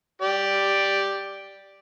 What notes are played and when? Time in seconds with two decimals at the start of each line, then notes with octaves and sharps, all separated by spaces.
0.22 G4 D5